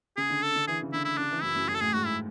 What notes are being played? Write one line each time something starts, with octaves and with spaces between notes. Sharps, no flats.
C#3 G#4
D3
A4
D3
E3 G#4
C#3
D3 E4
E4
C#3 D4
E3
F#2 E4
F#2
F#2 G#4
A4
A2 G#4
G#2 F#4
E4